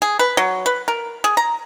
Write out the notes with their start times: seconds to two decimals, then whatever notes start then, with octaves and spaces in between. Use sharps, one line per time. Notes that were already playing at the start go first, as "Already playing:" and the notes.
0.02 G#4
0.19 B4
0.37 F#3
0.66 B4
0.88 A#4
1.24 G#4
1.37 A#5